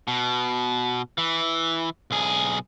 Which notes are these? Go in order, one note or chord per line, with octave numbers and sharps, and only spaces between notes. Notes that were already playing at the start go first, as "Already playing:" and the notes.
B2
E3
B1 G#4